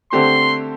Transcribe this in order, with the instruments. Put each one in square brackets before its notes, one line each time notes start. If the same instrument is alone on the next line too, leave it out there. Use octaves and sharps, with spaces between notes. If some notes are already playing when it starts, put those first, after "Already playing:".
[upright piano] D3 A3 C4 G4 C5 [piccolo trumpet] C6